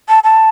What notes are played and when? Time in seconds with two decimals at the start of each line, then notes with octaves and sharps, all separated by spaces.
0.09 A5
0.24 A5